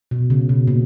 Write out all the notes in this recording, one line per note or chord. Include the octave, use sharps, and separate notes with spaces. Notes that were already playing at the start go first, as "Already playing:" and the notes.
B2
C#3
B2
A#2